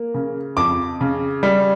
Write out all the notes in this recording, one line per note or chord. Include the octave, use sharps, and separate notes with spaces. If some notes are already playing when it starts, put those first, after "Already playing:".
Already playing: A#3
C#3
F2 D6
C#3
G3